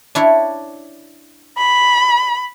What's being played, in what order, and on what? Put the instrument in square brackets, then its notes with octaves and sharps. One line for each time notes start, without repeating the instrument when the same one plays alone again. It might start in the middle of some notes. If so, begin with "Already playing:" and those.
[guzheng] D4 E4 C#5
[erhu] B5